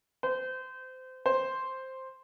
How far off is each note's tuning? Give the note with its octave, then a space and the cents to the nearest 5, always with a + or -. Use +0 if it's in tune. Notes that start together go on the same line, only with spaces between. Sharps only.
C5 -25
C5 +5